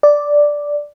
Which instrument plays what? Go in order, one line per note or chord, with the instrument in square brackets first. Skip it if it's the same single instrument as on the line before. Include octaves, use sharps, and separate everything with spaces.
[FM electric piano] D5